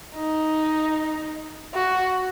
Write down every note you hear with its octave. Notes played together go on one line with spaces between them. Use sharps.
D#4
F#4